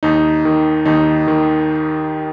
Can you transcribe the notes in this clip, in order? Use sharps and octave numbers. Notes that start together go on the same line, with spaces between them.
D#2 D#4
D#3
D#2 D#4
D#3